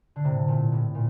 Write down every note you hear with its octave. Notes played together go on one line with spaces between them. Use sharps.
D3
A2 C3
A#2
A2
A#2